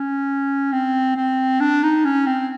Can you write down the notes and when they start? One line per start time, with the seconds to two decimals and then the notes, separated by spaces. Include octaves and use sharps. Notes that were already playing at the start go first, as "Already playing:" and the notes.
Already playing: C#4
0.72 C4
1.17 C4
1.60 D4
1.83 D#4
2.05 C#4
2.27 C4